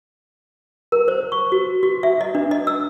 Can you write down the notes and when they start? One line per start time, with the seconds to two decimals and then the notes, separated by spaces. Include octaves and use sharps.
0.92 A#4
1.08 C5
1.32 C#6
1.52 F#4
1.83 F#4
2.03 E5
2.21 D#5
2.35 D4
2.51 D#5
2.67 E6